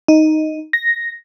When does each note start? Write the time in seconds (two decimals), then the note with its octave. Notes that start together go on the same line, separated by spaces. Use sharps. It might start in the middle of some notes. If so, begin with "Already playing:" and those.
0.08 D#4
0.73 A#6